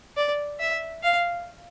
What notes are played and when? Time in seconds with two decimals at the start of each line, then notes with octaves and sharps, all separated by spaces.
0.17 D5
0.60 E5
1.03 F5